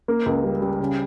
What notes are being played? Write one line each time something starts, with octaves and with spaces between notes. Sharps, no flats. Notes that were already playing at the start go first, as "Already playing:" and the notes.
A#3
C#2
G3
G3
C#3